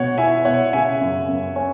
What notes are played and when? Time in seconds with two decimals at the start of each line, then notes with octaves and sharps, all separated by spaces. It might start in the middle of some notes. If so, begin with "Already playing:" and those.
Already playing: B2 C#5 F#5
0.18 E4 E5 G#5
0.45 B2 C#5 F#5
0.73 C#3 E5 G#5
1.01 F#2
1.28 F#2
1.56 C#4